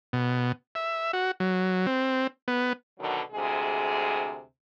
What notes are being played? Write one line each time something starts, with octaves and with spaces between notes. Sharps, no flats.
B2
E5
F#4
F#3
C4
B3
B2 D3 D#3 F#3
D2 C3 G#3 G#4